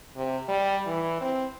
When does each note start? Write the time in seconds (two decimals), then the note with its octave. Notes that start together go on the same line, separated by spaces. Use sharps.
0.16 C3
0.48 G3
0.87 E3
1.21 C4